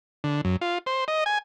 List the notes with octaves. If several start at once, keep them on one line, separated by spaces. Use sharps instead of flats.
D3
F#2
F4
C5
D#5
G#5